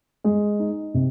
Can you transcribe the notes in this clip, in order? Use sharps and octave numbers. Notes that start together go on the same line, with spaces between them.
G#3
D#4
C3